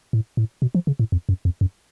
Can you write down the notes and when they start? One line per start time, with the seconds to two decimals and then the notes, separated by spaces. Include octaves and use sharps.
0.13 A2
0.37 A2
0.62 B2
0.75 F3
0.87 C#3
0.99 A2
1.12 F2
1.29 F#2
1.45 F2
1.61 F#2